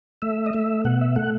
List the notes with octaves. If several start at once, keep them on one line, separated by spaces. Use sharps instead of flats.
A3 E5
D#5
A3 E5
B2 F#5
E5
A3 F#5